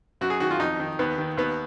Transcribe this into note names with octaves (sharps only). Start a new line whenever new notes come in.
F#2 F#4
G#4
D#3 F#4
F4
F2 D#4
D#3
D#2 B3
D#3
D#2 B3